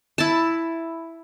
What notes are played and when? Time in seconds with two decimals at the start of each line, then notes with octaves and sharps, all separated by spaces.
0.18 E4 A5